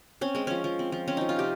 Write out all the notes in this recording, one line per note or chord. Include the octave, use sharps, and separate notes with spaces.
C4 C#4
G#3 C4
F3 C#4
F3
C4
F3
C4 C#4
F3 D#4
F4
C3 G4